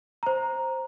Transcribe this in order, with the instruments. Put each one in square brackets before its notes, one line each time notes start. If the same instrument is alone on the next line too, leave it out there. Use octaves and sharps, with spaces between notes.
[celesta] C5 A#5